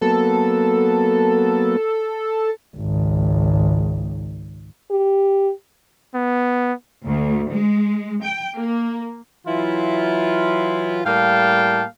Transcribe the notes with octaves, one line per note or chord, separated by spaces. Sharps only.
F#3 A#3 B3 A4
G#1 C#2
G4
B3
D2
G#3
G5
A#3
E3 F#3 E4 F4
A2 G3 A#3 F5 G5 A5